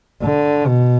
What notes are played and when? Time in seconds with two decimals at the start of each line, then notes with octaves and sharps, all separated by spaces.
0.23 D3
0.67 B2